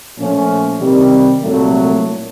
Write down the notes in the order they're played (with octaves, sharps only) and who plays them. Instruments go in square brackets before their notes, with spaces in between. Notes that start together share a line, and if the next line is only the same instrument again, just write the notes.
[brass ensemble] A#2 F3 A3 C#4
C3 D#3 G3
C2 A#2 F#3 A3